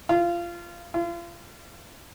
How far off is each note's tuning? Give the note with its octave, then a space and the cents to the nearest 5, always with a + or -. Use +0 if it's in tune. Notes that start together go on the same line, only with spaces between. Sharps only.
F4 -20
F4 -35